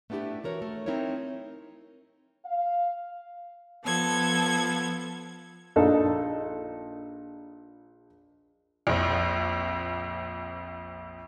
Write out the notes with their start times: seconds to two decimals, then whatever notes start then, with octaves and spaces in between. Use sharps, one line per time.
0.10 A3 B3 D4 E4 G4
0.44 E3 F#4 A#4 C#5
0.62 A3
0.86 C4 D#4 E4 A#4 C#5
2.46 F5
3.84 F3 B3 A4 G#6
5.76 A#1 D4 D#4 A4
8.87 A#1 F2